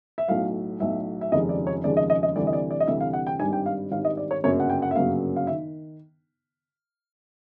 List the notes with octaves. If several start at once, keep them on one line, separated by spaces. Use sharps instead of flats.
E5
B1 A2 F#3 F5
B1 A2 F#3 E5
E5
F1 D#2 C#3 F3 G#3 D#5
D5
C#5
F1 D#2 C#3 F3 G#3 D5
D#5
D#5
D#5
D2 C3 E3 G3 D5
D#5
D5
D5
D#5
D2 C3 E3 G3 E5
F5
F#5
G5
G#1 G2 D#3 G3 G#5
G5
F5
G#1 G2 D#3 G3 F5
D#5
D5
C#5
G1 F#2 C#3 F#3 A#3 C#5
F#5
G5
F#5
E5
G1 F#2 C#3 F#3 A#3 F5
F5
D#3 E5